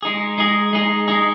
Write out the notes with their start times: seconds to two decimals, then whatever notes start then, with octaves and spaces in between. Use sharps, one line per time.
0.03 G#3 D#4 G#4
0.38 G#3 D#4 G#4
0.73 G#3 D#4 G#4
1.08 G#3 D#4 G#4